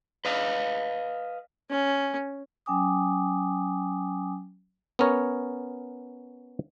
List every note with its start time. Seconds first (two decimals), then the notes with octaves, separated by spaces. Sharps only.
0.25 B4 D#5 F5
1.70 C#4
2.66 F#3 C#4 G5 G#5 D6 D#6
4.99 B3 C#4 A#4 C#5